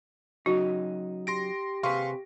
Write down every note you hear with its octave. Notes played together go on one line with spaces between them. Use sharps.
C#3 F#3 D#4 F#4
G4 C6 A#6 D7
C3 G#4 B4 F5 C6 C#6